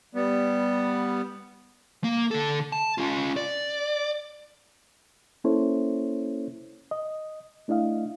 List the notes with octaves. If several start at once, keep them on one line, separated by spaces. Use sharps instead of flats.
G3 B3
A#3
D3 A4
A5
C#4 F4
D5
A#3 C#4 E4 A4 C5 C#5
D#5
A3 D4 E4 D#5 F5